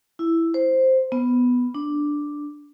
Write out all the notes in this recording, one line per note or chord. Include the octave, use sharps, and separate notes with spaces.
E4
C5
B3
D4